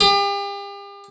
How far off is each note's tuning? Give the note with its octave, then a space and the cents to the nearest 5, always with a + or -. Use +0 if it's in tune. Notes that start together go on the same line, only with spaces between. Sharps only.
G4 +40